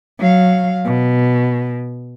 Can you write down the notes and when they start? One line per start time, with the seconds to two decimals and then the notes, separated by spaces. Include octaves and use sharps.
0.19 F#3 F5
0.85 B2